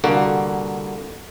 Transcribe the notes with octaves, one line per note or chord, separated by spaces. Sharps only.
C2 D3 A#3 F#4